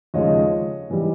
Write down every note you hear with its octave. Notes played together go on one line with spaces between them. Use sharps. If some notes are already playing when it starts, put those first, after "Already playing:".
D#2 C#3 F3 G#3 C#5 D#5
G#2 E3 G3